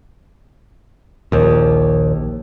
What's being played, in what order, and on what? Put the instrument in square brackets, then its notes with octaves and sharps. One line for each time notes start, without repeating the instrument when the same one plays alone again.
[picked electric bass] A#1 D#2